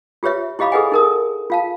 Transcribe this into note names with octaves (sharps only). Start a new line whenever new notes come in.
F4 G4 B4 C#5 E5
E4 G4 D#5 F5 B5 D6
G#4 A4 B4 D#5 F#5 G#5
D#4 A#4 D#6
F4 F5 A5